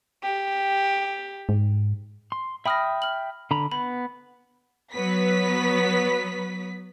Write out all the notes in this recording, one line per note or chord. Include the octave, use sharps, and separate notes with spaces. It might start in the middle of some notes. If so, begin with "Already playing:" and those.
G4
G#2
C6
E5 G5 B5 D#6 F6 A#6
F6 F#7
D3 A#5 B5
B3 B5
F#3 B3 B4 B6